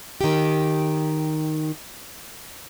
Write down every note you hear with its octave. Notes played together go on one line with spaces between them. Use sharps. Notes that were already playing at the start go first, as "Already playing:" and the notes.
D#3 G4